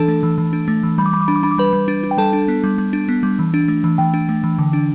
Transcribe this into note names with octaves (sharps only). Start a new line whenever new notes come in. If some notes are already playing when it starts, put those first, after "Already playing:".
Already playing: E3 D4 A4 A5
A3
E3
E3
D4
A3
E3
G3 B5
D6
G3 B5
D6
D4 B5
D6
D4 B5
D6
G3 B4 B5
G3
D4
D4
G5
G3 A4 A5
D4
B3
G3
G3
D4
B3
G3
E3
D4
A3
E3
E3 G5
D4
A3
E3
D3
D4